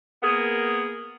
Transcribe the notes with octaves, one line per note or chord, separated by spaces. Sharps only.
A#3 B3 G#4 A#4